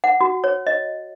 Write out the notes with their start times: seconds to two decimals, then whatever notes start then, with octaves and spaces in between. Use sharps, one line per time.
0.04 F#5
0.21 F#4
0.44 C#5
0.67 D#5